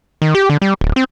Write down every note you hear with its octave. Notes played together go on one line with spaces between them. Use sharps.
D#3
G4
D3
G3
D1
C4